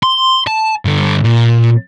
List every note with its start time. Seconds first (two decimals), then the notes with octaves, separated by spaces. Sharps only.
0.03 C6
0.47 A5
0.85 G2 D3
1.24 A#2